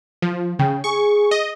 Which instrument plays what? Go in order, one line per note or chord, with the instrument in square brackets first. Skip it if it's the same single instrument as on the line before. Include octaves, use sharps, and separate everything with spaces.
[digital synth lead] F3
[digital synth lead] C#3 [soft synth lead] G5
[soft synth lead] G#4 [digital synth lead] C#6
[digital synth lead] D#5